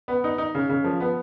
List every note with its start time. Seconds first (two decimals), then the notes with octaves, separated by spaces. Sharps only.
0.08 B3
0.24 D#4
0.38 D#4
0.55 C#3
0.69 C#3
0.84 F3
1.00 B3